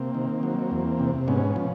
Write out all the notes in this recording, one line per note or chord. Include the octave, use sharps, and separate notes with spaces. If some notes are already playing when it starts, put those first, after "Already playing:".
Already playing: C3 A#3 C4
D#3
F#3
E2
C3
G#2 B3 C#4
F3